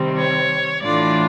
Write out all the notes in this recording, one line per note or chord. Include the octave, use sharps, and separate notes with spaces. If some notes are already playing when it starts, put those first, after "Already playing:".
Already playing: C3 D#3 G3 C4
C#5
A2 E3 A3 D4 F4 D5